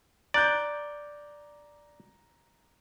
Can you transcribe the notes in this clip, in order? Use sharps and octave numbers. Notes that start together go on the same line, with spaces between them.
D5 A#5 F#6 G6